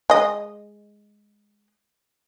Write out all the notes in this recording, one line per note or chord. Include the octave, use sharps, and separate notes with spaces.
G#3 D#5